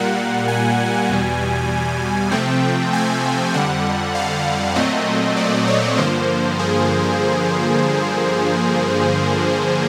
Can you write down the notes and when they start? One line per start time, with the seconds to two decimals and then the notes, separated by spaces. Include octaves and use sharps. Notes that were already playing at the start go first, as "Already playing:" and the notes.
Already playing: A#2 G3 A#3 F#5
0.48 G#5
1.09 E2 B2 G3
2.31 C3 F3 A3 C4 G5
2.93 G#5
3.54 F2 D3 G3 F#5
4.15 F5
4.76 A#2 F#3 A3 C4 D#5
5.37 D5
5.68 C#5
5.97 G2 D3 F3 A#3 C5
6.59 G#4